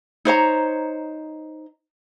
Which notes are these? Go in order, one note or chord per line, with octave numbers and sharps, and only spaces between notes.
D#4 C5 C#5 A#5